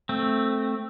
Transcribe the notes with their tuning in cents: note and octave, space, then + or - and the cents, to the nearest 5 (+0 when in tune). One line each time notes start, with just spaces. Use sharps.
A3 +0 C4 +0